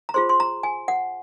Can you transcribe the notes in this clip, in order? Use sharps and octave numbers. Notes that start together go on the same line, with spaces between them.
A#5
F4 G#4 C5 C6
C6
A#5
G#5
F#5